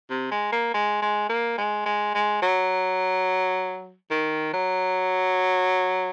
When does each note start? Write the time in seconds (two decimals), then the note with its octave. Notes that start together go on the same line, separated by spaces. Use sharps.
0.10 C3
0.31 G#3
0.52 A#3
0.74 G#3
1.02 G#3
1.30 A#3
1.58 G#3
1.86 G#3
2.15 G#3
2.42 F#3
4.11 D#3
4.54 F#3